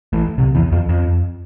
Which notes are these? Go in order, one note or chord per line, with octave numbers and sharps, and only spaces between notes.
A1 A2
C2 C3
E2 E3
F2 F3
F2 F3